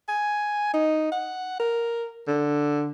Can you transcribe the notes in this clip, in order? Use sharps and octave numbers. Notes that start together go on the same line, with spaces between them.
G#5
D#4
F#5
A#4
D3